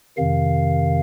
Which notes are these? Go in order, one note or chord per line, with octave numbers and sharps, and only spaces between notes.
F2 C3 D#3 F5